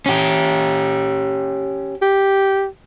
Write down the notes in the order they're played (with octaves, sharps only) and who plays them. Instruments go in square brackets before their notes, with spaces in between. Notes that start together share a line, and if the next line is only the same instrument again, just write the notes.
[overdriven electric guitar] C#4 G4
[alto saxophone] G4